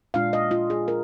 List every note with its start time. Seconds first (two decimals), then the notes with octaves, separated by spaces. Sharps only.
0.14 A#2 G#3 D4 F4 F5
0.33 D#5
0.51 F4
0.70 G#4
0.88 F4 A#4